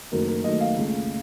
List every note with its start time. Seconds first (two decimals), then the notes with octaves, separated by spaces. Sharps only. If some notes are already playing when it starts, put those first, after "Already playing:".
0.12 F#1 F#2 D#3 A3 A#4
0.28 A#4
0.44 F#1 F#2 D#3 A3 D#5
0.60 F5
0.76 C#2 C#3 A3